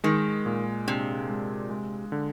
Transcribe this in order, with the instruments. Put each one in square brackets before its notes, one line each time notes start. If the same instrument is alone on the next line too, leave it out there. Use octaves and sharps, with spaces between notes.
[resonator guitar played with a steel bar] D#3 [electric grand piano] G#3
[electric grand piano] A#2
[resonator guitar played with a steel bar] C3 [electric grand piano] D4
[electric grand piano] G#3
G#3
D3